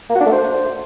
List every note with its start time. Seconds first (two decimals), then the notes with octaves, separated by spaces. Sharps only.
0.10 A#3
0.15 F#4
0.21 D4
0.26 A3
0.32 C5